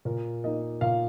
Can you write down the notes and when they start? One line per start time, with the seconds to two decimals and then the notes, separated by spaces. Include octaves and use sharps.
0.05 A#2 A#4
0.44 A#3 D#4 D#5
0.81 A#2 F5